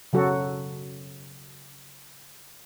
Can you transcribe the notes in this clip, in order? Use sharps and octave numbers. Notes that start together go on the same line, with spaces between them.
C#3 F#3 F#4 A4